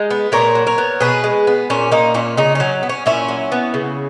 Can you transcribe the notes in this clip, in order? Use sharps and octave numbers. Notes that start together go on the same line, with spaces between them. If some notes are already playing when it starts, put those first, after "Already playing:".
Already playing: G#3 D#4
B3
A#2 A#4 C#5
F#3
A#4 C#5
B3
B2 G#4 B4
G#3
B3
A#2 C#4
A#3 D#4
A#2 C#4
C#3 D#4
F#3 C#4
B3
C#4
A#2 C#4 E4
F#3
B3
C#3